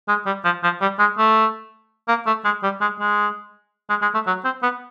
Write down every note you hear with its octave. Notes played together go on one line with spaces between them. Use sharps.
G#3
G3
F3
F3
G3
G#3
A3
A#3
A3
G#3
G3
G#3
G#3
G#3
G#3
A3
F#3
C4
B3